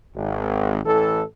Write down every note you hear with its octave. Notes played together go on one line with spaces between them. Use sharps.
G#1
A1 E3 A4